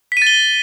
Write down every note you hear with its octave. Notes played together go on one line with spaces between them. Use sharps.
A6 B6 D#7 G7